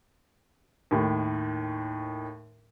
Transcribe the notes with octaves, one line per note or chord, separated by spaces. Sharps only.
D#2 A2 D#3